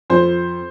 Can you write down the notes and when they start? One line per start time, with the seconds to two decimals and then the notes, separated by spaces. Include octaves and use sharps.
0.10 F2 C5